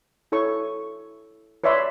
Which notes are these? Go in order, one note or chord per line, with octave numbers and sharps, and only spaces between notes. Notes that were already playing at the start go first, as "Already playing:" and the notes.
E4 A4 C#5 C#6
B4 C#5 D5 E5 B5 C6